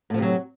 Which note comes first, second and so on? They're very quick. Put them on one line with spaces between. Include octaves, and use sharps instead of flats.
A2 F3 C3 F#3